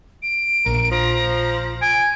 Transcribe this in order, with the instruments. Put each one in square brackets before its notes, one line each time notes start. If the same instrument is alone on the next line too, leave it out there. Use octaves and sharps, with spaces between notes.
[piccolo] D7
[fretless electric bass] A#1 [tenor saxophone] A#4
[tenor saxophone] F3 [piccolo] A#5
[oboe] G#5 [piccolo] D7